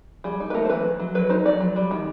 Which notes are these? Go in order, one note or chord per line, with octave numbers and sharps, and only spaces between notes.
G3 G#4
D#4
B4
A3 A#4
C5
E3 B4
D#3
F#3
F#3 B4
D#4 C5
F#3 D5
F#3
G3
D#3